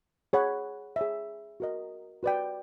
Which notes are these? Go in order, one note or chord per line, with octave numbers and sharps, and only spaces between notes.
G#4 C#5 F#5 B5
G#4 C#5 E5
F#4 A#4 D#5
F#4 B4 D5 G5